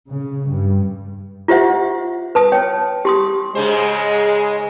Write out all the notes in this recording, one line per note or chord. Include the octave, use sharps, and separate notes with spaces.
C#3
G2
F4 G4 C5 E5 F#5
B4 A5 D#6
C#5 G5
G4 C6 D#6
G#2 C#3 G#3 C5